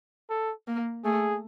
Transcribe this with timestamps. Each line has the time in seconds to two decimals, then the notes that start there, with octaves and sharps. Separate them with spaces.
0.30 A4
0.67 A#3
1.05 A3 G#4